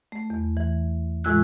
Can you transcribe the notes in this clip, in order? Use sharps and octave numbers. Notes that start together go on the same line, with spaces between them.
A3
E2
E3
A2 E3 G#3 F4 E6 F#6